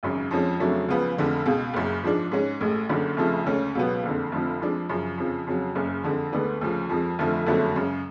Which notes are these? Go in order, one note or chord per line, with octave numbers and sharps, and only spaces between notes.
G#1 F#2 C#3
F2 F3 G#3 C#4
F2 C#3 F#3 A3 D4
C#2 C#3 F3 B3
F1 F2 D3 G#3
C#2 B2 G#3
F#1 F#2 C#3
G#2 F3 G#3 D4
G#2 G#3 C#4
A1 A2 G#3
F#1 F#2 D3
F1 F2 C#3 F3 A3
D2 C#3 G#3 C#4
C#2 B2 F#3 B3
F#1 F2 D3
F1 F2 D3 F3
F2 F3 G#3 D4
F#2 C#3 F3
F2 C#3 F3
F2 C#3 F#3
F#1 F#2 C#3
F2 D3 G#3
D2 D3 G#3 B3 D4
D2 C#3 F3
F2 F3 G#3
F1 F2 D3 F3 A3
F#1 F2 D3 F#3 A3
F#2 C#3 G#3